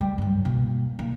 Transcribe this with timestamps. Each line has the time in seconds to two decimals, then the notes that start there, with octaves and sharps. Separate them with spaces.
0.01 G3
0.18 G2 F#3
0.45 B2 A#3
0.99 A#3